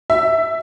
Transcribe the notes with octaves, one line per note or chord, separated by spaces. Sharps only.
E5